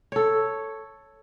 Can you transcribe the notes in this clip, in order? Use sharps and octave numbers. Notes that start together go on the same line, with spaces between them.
A4 C#5